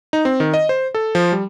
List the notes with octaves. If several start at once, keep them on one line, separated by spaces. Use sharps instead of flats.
D#4
C4
D#3
D#5
C5
A4
F3
G3